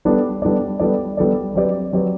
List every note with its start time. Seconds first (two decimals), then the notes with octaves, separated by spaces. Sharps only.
0.05 G3 B3 D4 A4 D5
0.42 G3 B3 D4 A4 D5
0.80 G3 B3 D4 A4 D5
1.17 G3 B3 D4 A4 D5
1.55 F#3 C4 G4 B4 D5
1.93 F#3 C4 G4 B4 D5